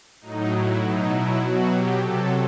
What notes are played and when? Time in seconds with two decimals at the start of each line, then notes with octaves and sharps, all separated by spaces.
0.21 A2 F#3 D#4
0.51 E4
0.80 B2 F#3 D#4
1.09 E4
1.39 B2 F#3 F#4
1.69 G4
1.98 C3 F#3 A4